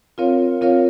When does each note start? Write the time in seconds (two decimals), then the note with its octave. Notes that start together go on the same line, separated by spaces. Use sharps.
0.18 C4 F4 A#4 C#5 F5
0.61 C4 F4 A#4 C#5 F5